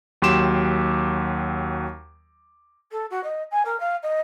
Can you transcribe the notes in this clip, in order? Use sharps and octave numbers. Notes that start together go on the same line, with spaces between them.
D#2 F#3 G4 C6 D6 E7
A4
F#4
D#5
G#5
A#4
F5
D#5